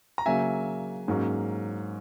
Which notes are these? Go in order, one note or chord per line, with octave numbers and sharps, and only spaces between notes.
A#5
C#3 F#3 A#3 E5 G#5
G#2 F#3 A#3 C#4